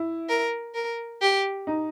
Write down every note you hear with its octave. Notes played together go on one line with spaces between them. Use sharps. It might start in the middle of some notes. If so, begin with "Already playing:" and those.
Already playing: E4
A#4
A#4
G4
D#4